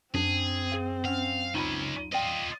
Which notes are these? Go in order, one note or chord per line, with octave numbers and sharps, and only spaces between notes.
F#2 C4 D4 G#4
G#4 F5
C#4 F5 F#5
C#2 C#4 D#4 F4 B5
F4 D5 D#5 G5